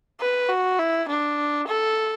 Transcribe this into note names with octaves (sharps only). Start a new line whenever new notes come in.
B4
F#4
E4
D4
A4